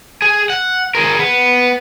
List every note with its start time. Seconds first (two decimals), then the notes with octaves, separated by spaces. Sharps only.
0.22 G#4
0.50 F#5
0.95 G#4 A#4
1.19 B3